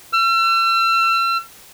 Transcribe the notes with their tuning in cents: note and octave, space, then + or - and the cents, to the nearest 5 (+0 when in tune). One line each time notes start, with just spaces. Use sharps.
E6 +40